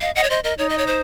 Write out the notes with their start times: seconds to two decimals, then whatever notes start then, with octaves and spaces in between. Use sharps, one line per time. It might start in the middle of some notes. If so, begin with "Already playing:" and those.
0.01 D#5 F5
0.15 D#5 F#5
0.24 C#5
0.30 C5 D#5
0.44 A#4 D#5
0.58 D#4 C#5
0.69 D#5
0.78 C#5
0.87 C5